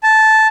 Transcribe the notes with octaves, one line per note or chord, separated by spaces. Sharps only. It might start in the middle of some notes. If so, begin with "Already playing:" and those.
A5